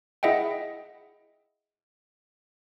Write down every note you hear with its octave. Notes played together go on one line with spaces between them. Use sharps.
E4 G#4 D#5 E5 F#5 G5